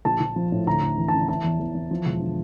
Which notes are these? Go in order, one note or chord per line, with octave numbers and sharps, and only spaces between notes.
A#1 A5
A#1
F3
A2
D2 A#5
D2
E3
C#3 A5
E3 A5
E2
E2
E3
F3
E1
D3